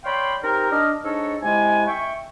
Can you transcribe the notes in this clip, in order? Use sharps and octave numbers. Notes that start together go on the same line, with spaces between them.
C#5 D5 F5 G5 B5 C6
C4 D#4 G4 A#4
D4 D#5 F6
G#2 D4 D#4 A4 C#5 D#5
C3 G#3 E4 G#5
E5 G5 C#6